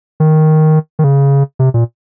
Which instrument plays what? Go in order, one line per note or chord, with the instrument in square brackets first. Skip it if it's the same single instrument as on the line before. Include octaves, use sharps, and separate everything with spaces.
[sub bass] D#3
D#3
C#3
C3
A#2